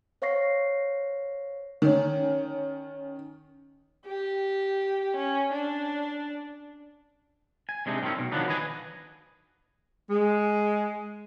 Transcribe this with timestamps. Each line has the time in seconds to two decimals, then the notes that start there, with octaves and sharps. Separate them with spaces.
0.22 C5 C#5 F5 C#6 A#6 C7
1.82 D#3 C#4
4.06 G4
5.16 C#4
5.53 D4
7.69 G#5
7.86 C3 G#3 D4 D#4
8.02 A2 D#3 G3 C4 C#4
8.17 B1 B2
8.32 D#3 F3 F#3 B3 D4 D#4
8.48 B4 D#5 G#5
10.10 G#3